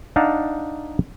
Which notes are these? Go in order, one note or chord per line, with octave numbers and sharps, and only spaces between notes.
D4 D#4 F5 F#5 A5